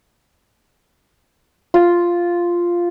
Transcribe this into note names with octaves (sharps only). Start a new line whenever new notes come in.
F4